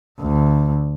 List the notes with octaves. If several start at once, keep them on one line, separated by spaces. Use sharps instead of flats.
D2